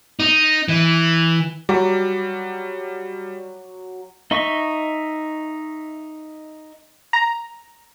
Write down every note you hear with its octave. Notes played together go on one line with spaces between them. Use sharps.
D#4
E3
F#3 G3 D6
D#4 D#5 E5 C#6
A#5